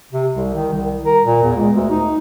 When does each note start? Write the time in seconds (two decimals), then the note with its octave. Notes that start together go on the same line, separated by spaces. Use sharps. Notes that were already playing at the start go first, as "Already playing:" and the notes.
0.13 C3
0.34 C2
0.54 D#3
0.73 C2
1.05 A#4
1.24 A#2
1.43 E2
1.56 C#2
1.74 D2
1.90 D#4